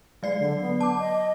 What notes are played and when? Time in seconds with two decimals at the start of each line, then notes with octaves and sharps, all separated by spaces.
0.23 F#3 G#3 D5 C7
0.39 D3
0.61 B3
0.81 A5 D6
0.99 D#5